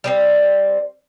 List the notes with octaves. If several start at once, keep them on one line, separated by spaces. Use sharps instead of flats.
G3 B3 C4